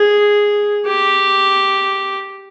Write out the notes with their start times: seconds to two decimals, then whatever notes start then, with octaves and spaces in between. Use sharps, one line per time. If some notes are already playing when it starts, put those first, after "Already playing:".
Already playing: G#4
0.87 G4